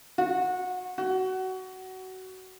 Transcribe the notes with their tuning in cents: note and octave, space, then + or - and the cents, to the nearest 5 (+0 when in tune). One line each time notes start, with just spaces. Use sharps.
F#4 -25
F#4 +20